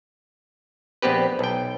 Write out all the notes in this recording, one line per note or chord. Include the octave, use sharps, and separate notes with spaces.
A#1 B3 C4 G4 B4
B1 G5